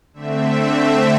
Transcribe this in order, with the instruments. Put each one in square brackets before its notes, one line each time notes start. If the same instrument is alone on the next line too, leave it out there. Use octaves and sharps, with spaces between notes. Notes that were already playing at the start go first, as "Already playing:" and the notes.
[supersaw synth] D3 A3 C4 E5